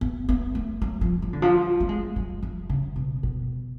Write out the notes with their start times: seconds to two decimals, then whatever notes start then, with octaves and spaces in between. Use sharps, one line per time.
0.01 B3
0.29 B3
0.55 A3
0.82 F#3
1.01 F3
1.22 F#3
1.33 D3
1.42 F3
1.80 A3
1.89 G#3
2.16 F#3
2.43 F3
2.70 C#3
2.96 B2
3.23 B2